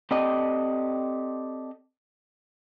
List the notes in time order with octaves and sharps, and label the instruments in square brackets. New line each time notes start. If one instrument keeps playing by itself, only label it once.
[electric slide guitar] C4 G4 A4 D5 D#5